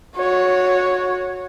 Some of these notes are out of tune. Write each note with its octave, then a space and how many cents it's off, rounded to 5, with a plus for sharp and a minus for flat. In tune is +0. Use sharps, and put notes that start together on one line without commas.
F#4 -20 C#5 +0